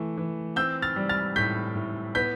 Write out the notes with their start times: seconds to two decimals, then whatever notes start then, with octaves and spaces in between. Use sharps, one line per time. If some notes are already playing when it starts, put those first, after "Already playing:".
Already playing: E3 A3
0.17 E3
0.56 C4 E6 G6
0.82 F6 A6
0.96 G3
1.09 F6 A6
1.36 A2 G6 B6
1.75 A2
2.15 B3 G6 B6